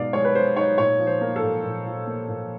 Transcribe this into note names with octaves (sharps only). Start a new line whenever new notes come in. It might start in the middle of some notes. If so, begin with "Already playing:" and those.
Already playing: B2 G#3 D#4 D5 F5
G#3 C#5
B4
B3 C5
D#4 C#5
A#2 C#5
F3
C5
A#3
A4
A#2
A#2
F3
A#3
A#2